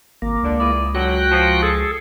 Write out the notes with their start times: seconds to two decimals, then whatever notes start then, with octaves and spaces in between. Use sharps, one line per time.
0.22 G#1 A#3
0.43 C#2 D3 D4
0.60 E4 G#4 D5
0.95 D3 F#3 F#4 G5 F#6
1.31 F3
1.62 G#4 A4